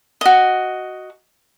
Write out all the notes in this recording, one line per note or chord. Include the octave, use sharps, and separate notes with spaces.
F#4 D#5